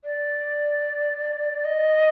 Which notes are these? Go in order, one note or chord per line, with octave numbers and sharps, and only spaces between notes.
D5
D#5